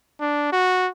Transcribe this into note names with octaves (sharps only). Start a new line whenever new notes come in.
D4
F#4